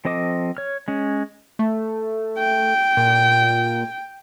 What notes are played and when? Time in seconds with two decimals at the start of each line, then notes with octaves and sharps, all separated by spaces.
0.05 F3 C4 A4 D#5 D6
0.57 C#5 F6
0.88 G#3 C#4
1.59 A3
2.38 G5
2.97 A#2